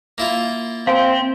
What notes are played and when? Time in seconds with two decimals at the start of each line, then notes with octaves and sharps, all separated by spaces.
0.18 A#3 E4 F4
0.87 C4 C5 F5 G#5